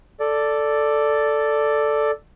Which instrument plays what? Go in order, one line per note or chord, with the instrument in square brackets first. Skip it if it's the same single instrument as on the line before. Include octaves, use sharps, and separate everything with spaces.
[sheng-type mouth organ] A4 D5